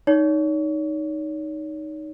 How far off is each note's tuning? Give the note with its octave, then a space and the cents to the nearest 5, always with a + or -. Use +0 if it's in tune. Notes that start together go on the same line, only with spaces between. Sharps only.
D#4 +0 C#5 +35